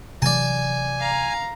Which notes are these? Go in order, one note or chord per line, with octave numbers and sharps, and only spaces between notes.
C3 E3 F#3 D5 G#5 A5
F5 A#5